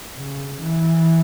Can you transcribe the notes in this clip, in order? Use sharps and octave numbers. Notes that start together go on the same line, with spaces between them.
C#3
E3